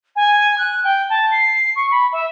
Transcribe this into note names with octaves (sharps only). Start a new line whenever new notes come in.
G#5
F#6
G5
A5
C7
C#6
B5
E5